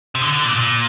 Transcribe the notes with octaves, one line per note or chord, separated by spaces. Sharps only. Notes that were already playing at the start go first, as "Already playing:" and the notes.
C3
D3
D3
A#2
A#2